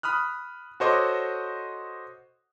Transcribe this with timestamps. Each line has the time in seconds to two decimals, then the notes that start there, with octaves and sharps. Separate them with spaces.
0.03 B5 D#6 F6 F#6
0.80 F#4 A4 C5 C#5 D#5 D6